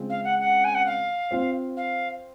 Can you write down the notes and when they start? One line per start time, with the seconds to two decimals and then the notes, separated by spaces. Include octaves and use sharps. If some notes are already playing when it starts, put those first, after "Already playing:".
Already playing: C#3 G#3 C4 F4
0.09 F5
0.24 F#5
0.39 F#5
0.64 G#5
0.74 F#5
0.86 F5
1.31 C4 F4 C5
1.77 F5